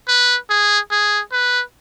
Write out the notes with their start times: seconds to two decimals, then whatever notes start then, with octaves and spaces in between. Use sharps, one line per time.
0.08 B4
0.50 G#4
0.91 G#4
1.32 B4